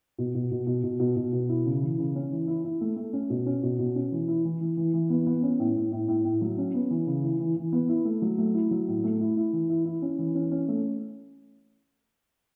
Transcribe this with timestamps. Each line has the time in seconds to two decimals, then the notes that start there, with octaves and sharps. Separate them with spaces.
0.18 B2
0.34 B2
0.51 B2
0.67 B2
0.83 B2
1.00 B2
1.16 B2
1.33 B2
1.49 E4
1.66 C#3
1.82 E3
1.98 C#3
2.16 C#4
2.31 E3
2.47 E4
2.64 E4
2.81 A3
2.96 A3
3.13 C#4
3.30 B2
3.46 C#4
3.63 B2
3.79 B2
3.96 C#4
4.12 E3
4.28 E4
4.45 E3
4.61 E3
4.77 E3
4.94 E3
5.10 B3
5.27 B3
5.43 C#4
5.59 A2
5.76 A2
5.92 A2
6.08 A2
6.25 A2
6.41 F#3
6.58 C#4
6.74 B3
6.91 E3
7.07 C#3
7.23 E3
7.39 E3
7.56 E3
7.72 B3
7.89 E4
8.05 A3
8.22 F#3
8.38 A3
8.54 E4
8.71 F#3
8.88 A2
9.04 A3
9.21 E4
9.37 E4
9.53 E3
9.69 E4
9.85 E4
10.02 C#4
10.19 E3
10.35 C#4
10.51 C#4
10.68 A3